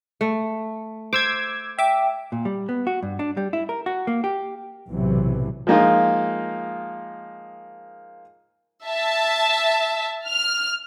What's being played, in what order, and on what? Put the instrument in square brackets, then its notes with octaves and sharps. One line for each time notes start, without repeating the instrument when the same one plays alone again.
[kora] A3
[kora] C5 [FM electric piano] D6 E6 G#6
[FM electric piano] E5 D6 [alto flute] G5
[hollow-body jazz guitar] A#2
G3
B3
F#4
G2
D4
G3
E4
A#4
F#4
A#3
G4
[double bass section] B1 A2 C3 E3 F#3
[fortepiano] F3 G#3 A#3 D#4 F4
[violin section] E5 A5
F6